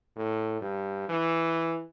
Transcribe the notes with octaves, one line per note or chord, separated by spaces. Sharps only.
A2
G2
E3